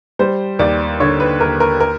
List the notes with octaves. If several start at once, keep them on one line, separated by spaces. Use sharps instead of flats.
G3 C5
D#2 D5
D3 C#5
B4
D#2 A#4
A#4
A#4